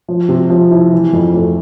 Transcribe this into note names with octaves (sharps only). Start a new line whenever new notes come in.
F3
C3
F3
E4
E3
F2
A3